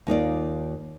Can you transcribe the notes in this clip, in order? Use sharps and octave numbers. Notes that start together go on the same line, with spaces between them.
D#2 D#4 F4 D5